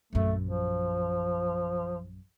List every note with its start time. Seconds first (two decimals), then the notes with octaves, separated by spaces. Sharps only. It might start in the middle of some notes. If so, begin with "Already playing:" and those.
0.13 A#1 F#2 A3
0.43 F3